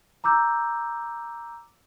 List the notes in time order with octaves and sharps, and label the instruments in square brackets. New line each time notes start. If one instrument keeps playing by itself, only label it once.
[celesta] A#5 D6 E6 G6